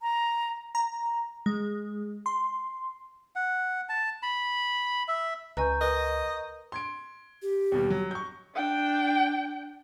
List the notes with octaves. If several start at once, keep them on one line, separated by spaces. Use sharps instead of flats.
A#5
A#5
G#3
C6
F#5
A5
B5
E5
C#2 B4 D#5 G#5 A#5 C#6 G6
A#4 B4 D#5
C6 G#6 D7
G4
D#2 B2 G3
F#3
C#6 G6
D4 G5